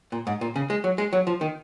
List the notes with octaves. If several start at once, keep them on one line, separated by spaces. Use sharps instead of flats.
A#2
G#2
A#2
C#3
G#3
F#3
G#3
F#3
F3
D#3